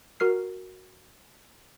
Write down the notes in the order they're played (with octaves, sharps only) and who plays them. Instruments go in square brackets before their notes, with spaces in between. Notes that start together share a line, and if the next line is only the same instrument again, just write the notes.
[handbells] F#4 A#4 F6 C7